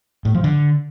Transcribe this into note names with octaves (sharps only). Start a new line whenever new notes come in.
A2
F3
D3